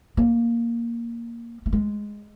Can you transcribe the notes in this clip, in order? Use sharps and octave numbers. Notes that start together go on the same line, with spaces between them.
A#3
A3
G#3